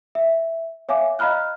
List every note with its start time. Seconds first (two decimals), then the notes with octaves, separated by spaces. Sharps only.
0.15 E5
0.89 C#5 E5 F5 G#5 D6
1.19 D#5 F5 A#5 B5 F6 F#6